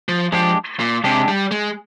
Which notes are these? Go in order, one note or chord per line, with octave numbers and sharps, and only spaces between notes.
F3
F3 G#3 D4 G4
A#2
C3 G#3 D4 G4
G3
G#3